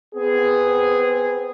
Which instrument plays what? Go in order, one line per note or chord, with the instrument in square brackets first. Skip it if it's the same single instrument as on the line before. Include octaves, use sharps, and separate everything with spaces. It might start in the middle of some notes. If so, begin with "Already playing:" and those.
[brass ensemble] B3 C4 G#4